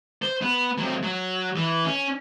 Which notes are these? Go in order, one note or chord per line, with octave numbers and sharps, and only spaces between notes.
C5
B3
F#3 C4
F#3
E3
C#4